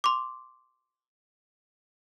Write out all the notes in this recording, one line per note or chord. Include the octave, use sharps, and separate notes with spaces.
C6 D6